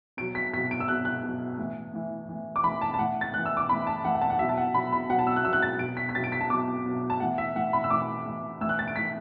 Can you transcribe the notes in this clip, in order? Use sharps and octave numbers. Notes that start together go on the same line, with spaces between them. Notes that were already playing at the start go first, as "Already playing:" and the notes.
B2 F#3 D7
B6
B2 F#3 B6
D7
E6
B2 F#3 F#6
F#6
B2 F#3
A2 E3
A2 E3
A2 E3
D6
A2 E3 B5
A5
A5
A2 E3 F#5
A6
A2 E3 F#6
E6
D6
A2 E3 B5
A5
A2 E3 F#5
F#5
A5
F#5
B2 F#3 E5
A5
F#5
B2 F#3 B5
B5
B2 F#3 F#5
A5
E6
F#6
B2 F#3 E6
F#6
A6
B2 F#3 D7
B6
B6
B2 F#3 A6
D7
B6
A5
B2 F#3 D6
B2 F#3
A5
A2 E3 F#5
E5
A2 E3 F#5
B5
E6
A2 E3 D6
A2 E3
A2 E3 E6 F#6
A6
D7
A2 E3 B6